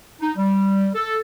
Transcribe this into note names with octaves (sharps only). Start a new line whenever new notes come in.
D#4
G3
A4